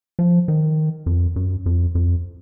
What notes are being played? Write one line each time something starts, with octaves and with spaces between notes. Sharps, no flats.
F3
D#3
F2
F#2
F2
F2